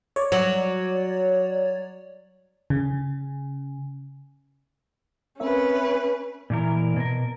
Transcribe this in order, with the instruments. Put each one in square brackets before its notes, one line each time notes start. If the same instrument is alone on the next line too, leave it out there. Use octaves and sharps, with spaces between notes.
[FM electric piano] C#5 D5
[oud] F#3
[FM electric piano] C#3
[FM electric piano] C4 A#4 E5 [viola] C#4 B4
[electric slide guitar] A#2 E3 A#4
B2 A#4